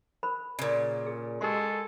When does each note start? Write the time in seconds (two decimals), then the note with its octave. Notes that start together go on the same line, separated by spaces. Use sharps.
0.23 A#4 C5 B5
0.59 A#2 C#3 D5
1.06 G#4
1.41 G#3 G4 A4 A#4 C6